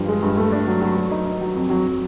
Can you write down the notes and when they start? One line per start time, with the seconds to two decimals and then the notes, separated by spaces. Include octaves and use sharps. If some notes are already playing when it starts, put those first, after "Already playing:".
Already playing: G2 F3
0.08 G#3
0.23 G2
0.37 A3
0.52 D4
0.67 F#3
0.82 F#3
0.96 F#3
1.11 D#4
1.26 D#4
1.41 F#3
1.56 F2
1.70 F#3
1.86 F#3